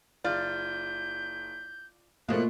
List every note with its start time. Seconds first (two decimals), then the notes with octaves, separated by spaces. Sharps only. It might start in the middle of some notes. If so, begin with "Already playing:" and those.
0.24 F#1 F4 D5 G6
2.29 B2 F3 A3 A#3 F4 F#6